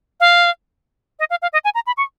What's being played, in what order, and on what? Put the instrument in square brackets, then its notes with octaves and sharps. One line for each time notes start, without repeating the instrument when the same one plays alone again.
[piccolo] F5
D#5
F5
F5
D#5
G#5
A#5
B5
C#6